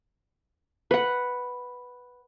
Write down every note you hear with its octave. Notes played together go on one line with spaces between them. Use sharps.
B4 F#5